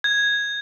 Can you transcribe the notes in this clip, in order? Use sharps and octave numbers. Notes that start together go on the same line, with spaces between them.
G#6